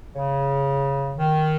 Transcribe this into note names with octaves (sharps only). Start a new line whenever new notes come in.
C#3
D#3